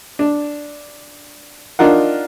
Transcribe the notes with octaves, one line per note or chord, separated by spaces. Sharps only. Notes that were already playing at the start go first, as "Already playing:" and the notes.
D4
D4 D#4 F4 A#4 F#5